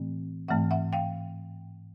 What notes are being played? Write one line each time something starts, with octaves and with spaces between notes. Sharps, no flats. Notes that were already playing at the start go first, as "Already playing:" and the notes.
Already playing: A2 E3 A3 C4
G#2 E3 A3 C4 E5 F#5
E5 F#5
F5 G5